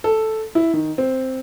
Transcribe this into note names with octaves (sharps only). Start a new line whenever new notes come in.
A4
E4
D#3
C4